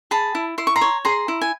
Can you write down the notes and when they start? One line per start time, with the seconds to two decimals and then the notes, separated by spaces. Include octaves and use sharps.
0.11 G#4 A5 B5
0.35 E4
0.58 E4 C6
0.67 C#6
0.76 A#5 C6
0.81 C#5
1.05 G#4 A#5 C6
1.28 E4
1.42 G#5